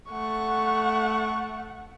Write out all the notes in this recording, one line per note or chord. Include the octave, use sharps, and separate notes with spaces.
A3 F#5 C#6